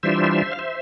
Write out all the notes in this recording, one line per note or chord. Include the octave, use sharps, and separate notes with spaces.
E3 G3 D4 F4 C5 E5
F5
C5 E5